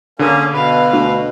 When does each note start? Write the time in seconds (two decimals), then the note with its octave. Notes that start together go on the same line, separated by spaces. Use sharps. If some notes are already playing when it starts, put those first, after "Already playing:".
0.19 D3 A#3 C#4 G#4 F5
0.53 B2 B4 F5
0.93 D2